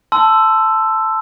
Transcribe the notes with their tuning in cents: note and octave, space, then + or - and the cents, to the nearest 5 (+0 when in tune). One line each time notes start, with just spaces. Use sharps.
A5 +0 C6 -15 E6 +10